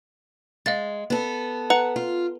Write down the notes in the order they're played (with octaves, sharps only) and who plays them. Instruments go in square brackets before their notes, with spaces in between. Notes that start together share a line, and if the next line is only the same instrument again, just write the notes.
[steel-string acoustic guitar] G#3 [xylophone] D#5 F5 A6
[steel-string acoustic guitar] B3 A4
[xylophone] B4 A#5 C#7 [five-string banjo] F#5
[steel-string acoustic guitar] F4